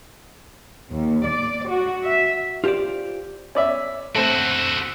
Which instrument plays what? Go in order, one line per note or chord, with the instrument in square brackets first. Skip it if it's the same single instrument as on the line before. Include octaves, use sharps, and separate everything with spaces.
[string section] D#2
D5
F#4
E5
[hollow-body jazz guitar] F4 G4 A4 C5 D5
[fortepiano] C#4 D5 E5
[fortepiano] A3 C4 [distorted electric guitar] F#4 A4